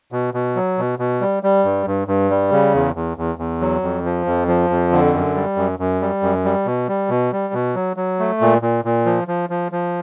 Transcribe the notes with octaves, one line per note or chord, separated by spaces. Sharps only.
B2
B2
F#3
B2
B2
G3
G3
G2
G2
G2
G3
C#3
E2
E2
E2
E2
F#3
F2
F3
F2
F3
F2
D3
F#2
G3
F#2
F#2
G3
F#2
G3
B2
G3
B2
G3
B2
F#3
F#3
A3
A#2
A#2
A#2
F3
F3
F3
F3